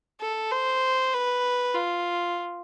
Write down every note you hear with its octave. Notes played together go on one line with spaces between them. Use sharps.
A4
C5
B4
F4